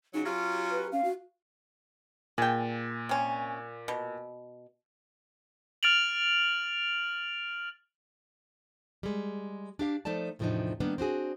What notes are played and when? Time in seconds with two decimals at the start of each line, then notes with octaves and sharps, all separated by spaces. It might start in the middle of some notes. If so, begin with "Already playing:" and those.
0.14 C#3 F#3 D#4
0.25 F#3 C#4 F4 G4
0.71 B4
0.92 C#4 F5
1.04 F#4
2.38 A#2 G#4 G5
3.09 C3 C#4
3.88 B2
5.83 F6 A6 D7 F7 F#7
9.03 G3 G#3
9.79 D4 G4 F5
10.05 F3 A3 D#4 D5 A5
10.39 E2 A2 C3 F3 D4 D#4
10.80 D#3 G3 A#3 B3 D4
10.98 C4 D4 F#4 G#4